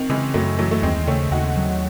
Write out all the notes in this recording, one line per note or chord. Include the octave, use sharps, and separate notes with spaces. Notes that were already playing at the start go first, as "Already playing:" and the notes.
Already playing: D#3 C4
C#3 E3 G#3
F#2 F#3 A3
E3 F#3 A3
A3
D#2 G#3 C4
C#3 A3 C#4
D#2 D#4 F#4
F#3